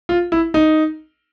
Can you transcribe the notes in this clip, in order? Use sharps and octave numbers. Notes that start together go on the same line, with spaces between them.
F4
E4
D#4